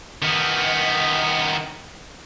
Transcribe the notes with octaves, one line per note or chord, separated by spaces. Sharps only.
D#3 B3